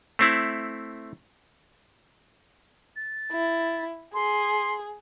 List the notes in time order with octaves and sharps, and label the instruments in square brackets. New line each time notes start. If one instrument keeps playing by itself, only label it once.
[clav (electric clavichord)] A3 C4 E4
[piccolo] A6
[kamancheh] E4
[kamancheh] G#4 [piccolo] C6